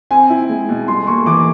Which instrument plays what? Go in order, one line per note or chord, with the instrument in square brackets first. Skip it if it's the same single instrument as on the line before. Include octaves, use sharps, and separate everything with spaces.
[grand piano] C4 [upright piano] G#5
[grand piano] E4
G#3
B2
[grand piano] G3 [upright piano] C6
[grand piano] A#3 [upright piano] C#6
[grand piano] E3 [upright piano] D6